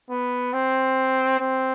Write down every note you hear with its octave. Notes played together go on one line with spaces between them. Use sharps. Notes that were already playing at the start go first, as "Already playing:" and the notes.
B3
C4
C4